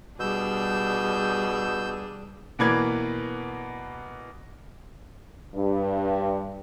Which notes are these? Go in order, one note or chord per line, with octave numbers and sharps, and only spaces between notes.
B2 G3 D4 G#4 E6 G6
B2 E3 A#3 B4 D5 G#6
G2